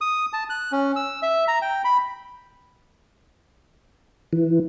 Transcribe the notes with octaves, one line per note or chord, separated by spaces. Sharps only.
D#6
A5
F#6
C#4
E6
E5
A#5
G5
B5
E3